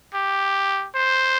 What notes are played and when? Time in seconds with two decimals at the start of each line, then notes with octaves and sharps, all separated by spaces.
0.14 G4
0.95 C5